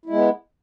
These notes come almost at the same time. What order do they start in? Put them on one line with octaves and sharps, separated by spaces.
E4 G#3 B3